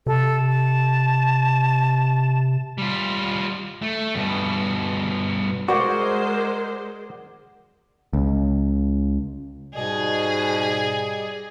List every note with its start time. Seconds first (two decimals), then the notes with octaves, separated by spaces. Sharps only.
0.07 C3 A4
0.48 A5
2.78 G3 F4
3.82 A3
4.15 G2 B2
5.68 G#3 F#4 A#4 C5 D5 F#5
8.13 C#2
9.74 G#2 B2 G3 G#4 D5 D#5